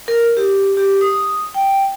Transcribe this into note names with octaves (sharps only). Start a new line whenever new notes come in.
A#4
G4
G4
D#6
G5